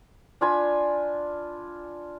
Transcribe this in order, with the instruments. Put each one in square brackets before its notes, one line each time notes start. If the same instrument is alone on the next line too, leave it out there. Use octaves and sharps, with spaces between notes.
[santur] D4 F4 G#5 B5